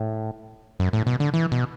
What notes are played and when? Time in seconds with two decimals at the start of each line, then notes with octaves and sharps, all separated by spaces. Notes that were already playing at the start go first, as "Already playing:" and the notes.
Already playing: A2
0.80 F#2
0.93 A2
1.07 B2
1.20 D3
1.34 E3
1.52 B2